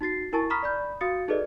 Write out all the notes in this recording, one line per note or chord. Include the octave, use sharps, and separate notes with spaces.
D#4 F#4 A6 C7
E4 A#4 G#5 A5 C#6 A6
A#5 B5 C#6 D#6 F6 B6
D5 B5 G6
F#4 F5 D#6 A6 C#7
D#4 G#4 A4 B4 D5 D#5